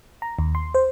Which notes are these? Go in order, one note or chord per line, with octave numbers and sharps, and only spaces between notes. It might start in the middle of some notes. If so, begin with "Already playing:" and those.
A#5
D#2
C6
C5